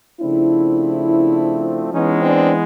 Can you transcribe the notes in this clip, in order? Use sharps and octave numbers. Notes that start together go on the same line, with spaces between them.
C#3 F3 A3 C4 D4 E4
E3 G#3 B3 C#4 D#4
C4 D4